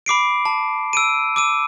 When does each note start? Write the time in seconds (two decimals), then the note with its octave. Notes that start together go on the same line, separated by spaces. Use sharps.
0.06 B5 D6 C7 D7
0.45 A5
0.93 E6 D7 D#7
1.36 D6 E6 D#7